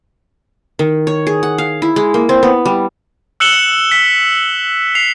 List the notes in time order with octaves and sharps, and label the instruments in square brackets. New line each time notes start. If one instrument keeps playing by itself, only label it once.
[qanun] D#3
C#5
G#4
F#5
F5
E4
G#3
A#3
C4
B3
G3
[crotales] E6 F#6 C#7 E7 F#7 G7
B6
C7 F7